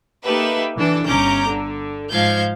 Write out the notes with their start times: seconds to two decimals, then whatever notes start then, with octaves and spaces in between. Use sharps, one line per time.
0.24 A#3 D#4 G4 A4 B4 E5
0.77 E3 D4 A4
1.07 G1 C#4 A#5 D6 G6
1.48 D3
2.11 G#2 F3 F5 G6 G#6